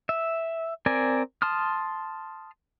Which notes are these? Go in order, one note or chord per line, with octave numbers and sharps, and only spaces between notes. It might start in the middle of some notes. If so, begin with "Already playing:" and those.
E5
C4 A#4 D5 G#5
A5 C6 D#6 F6